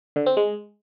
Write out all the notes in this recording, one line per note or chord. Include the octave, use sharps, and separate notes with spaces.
D3
C4
G#3